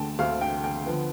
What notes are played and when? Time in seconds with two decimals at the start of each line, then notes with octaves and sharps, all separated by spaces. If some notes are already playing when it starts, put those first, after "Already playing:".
Already playing: D2 D3 A3 G5 A5
0.19 D2 D3 A3 C4 F5
0.41 G5
0.64 G5
0.86 D3 F3 B3